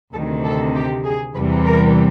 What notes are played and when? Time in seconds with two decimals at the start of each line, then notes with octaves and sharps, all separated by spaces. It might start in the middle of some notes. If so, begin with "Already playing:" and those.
0.13 D2 C3 D#3 A4
0.44 A4
0.74 G4
1.04 G#4
1.35 E2 C3 E3 G3 B4
1.66 A#4